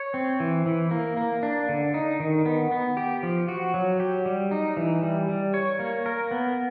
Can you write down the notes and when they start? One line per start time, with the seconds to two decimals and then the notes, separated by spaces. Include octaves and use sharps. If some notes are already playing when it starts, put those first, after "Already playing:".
Already playing: C#5
0.14 C4
0.40 E3
0.66 E3
0.91 A#3
1.17 A#3
1.43 D4
1.69 D3
1.94 D#4
2.20 D#3
2.46 B3
2.71 B3
2.97 G4
3.23 F3
3.48 F#4
3.74 F#3
4.00 G4
4.26 G3
4.51 D#4
4.77 E3
5.03 G3
5.28 G3
5.54 C#5
5.79 A#3
6.06 A#4
6.31 B3